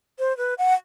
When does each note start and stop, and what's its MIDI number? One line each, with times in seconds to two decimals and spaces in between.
0.19 0.36 72
0.37 0.54 71
0.58 0.74 78